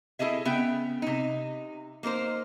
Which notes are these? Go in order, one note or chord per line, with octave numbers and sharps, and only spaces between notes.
E4 G#4 A4 D#5 E5
C#3 B3 E5 G5
C3 D#4
A#3 D#4 A#4 C5